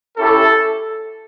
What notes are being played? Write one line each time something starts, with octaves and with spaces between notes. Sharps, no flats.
C#4 E4 G4 A4